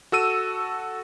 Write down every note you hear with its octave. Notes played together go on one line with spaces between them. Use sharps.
F#4 A4 E6 D#7